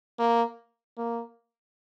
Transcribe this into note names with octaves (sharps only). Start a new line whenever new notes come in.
A#3
A#3